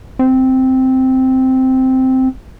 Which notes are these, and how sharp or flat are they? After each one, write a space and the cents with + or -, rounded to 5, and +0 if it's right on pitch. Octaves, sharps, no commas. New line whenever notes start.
C4 -5